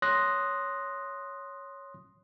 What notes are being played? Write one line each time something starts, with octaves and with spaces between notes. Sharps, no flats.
C#5 C6 D#6 F#6 A#6